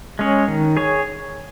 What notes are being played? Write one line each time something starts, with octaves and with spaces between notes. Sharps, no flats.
G#3 C#4 G#4 C#5
D#3
G#4 C#5